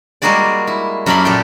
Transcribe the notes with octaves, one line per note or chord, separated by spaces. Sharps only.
G3 G#3 A#3 F#4 G#4 D5
E4
F#2 A#3 A4 D5 B5 C6
A#2 G4 A4 G5